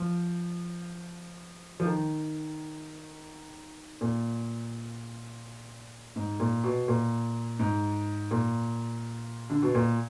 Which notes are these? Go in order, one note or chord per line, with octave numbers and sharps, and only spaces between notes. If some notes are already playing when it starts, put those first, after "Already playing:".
Already playing: F3
F3
D#3
A#2
G#2
A#2
B2
A#2
G#2
A#2
D3
B2
A#2